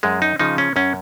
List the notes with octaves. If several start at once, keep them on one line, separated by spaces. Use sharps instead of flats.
F#2 G#3
D#4
C#3 F3 D#4
C#4
F#2 C#4